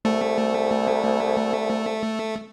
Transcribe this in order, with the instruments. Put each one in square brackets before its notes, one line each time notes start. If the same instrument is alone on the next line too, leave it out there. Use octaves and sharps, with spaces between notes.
[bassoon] C2 [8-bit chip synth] A3